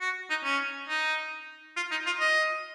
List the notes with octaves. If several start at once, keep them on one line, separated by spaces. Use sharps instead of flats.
F#4
D#4
C#4
D#4
F4
D#4
F4
D#5